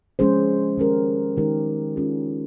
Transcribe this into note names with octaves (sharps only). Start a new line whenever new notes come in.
F3 G#3 C#4 G#4 C5
D#3 G#3 C#4 G4 A#4
D#3 G#3 D#4 G4 A#4
G#3 C#4 F4 G#4